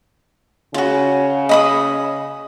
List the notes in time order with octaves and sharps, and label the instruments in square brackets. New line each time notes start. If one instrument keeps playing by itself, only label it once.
[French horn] C#3 [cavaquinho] F4 F#4
[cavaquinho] D#5 B5 D#6